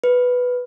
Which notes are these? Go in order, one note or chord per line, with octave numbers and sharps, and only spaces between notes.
B4